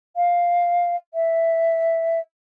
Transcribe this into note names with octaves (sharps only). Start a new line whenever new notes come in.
F5
E5